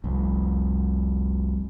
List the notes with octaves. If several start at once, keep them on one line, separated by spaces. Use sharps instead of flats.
F1 C2